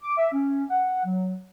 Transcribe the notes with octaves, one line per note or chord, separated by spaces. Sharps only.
D6
E5
C#4
F#5
F#3